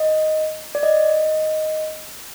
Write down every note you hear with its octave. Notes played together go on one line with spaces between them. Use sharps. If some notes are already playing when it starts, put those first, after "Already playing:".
Already playing: D#5
D5
D#5